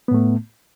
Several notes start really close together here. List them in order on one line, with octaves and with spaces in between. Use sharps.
B3 A2 A3